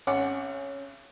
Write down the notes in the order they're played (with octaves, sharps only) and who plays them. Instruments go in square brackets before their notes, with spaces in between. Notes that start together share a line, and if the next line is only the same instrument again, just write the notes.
[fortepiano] G#1 F#5 D6 [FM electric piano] C#4